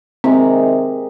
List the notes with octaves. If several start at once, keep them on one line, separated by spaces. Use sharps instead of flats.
C3 D#3 G#3 C4 D#4